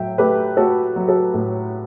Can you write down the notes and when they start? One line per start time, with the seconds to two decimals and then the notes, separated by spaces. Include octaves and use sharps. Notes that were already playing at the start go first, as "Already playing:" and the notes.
Already playing: A2 F#3 E5 G5
0.18 A3 G4 B4
0.57 A3 F#4 A4
0.96 F#3
1.08 F#4 A4
1.34 A2